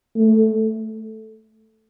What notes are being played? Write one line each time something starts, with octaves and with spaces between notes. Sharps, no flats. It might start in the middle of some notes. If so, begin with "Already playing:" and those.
A3